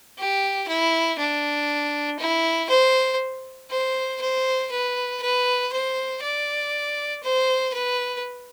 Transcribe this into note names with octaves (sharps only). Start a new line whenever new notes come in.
G4
E4
D4
E4
C5
C5
C5
B4
B4
C5
D5
C5
B4